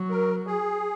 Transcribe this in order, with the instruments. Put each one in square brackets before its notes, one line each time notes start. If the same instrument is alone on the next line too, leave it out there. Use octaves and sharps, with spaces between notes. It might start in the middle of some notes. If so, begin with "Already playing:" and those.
Already playing: [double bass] F#3
[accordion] A#4
G#4